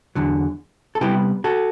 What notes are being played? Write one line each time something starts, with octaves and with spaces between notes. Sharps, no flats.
E2 D3 F#3
A4
C3 G3 B3 E4 G4
F#4 A4